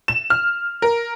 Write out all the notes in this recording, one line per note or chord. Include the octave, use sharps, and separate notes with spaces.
E7
F6
A#4